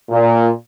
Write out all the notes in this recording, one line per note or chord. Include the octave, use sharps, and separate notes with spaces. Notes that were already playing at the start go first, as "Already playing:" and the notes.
A#2